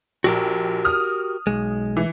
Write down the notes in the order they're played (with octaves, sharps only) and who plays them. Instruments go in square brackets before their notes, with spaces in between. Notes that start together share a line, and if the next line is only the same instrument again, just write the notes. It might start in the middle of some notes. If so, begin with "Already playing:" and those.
[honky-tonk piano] A#1 [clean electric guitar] F#4 G4 A#4
[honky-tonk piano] D#6 F6
[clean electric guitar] B1 G#3
[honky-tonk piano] E3